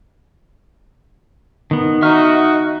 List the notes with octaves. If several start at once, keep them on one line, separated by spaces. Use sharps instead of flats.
D#3 B3
D#4 F#4 E5 C#6 F6